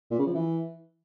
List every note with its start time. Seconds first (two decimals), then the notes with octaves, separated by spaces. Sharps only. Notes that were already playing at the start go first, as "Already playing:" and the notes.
0.11 A#2
0.19 C#3
0.26 F3
0.34 E3